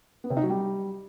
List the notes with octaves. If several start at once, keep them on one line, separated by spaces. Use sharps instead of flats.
B3
C3
D#4
F#3
G3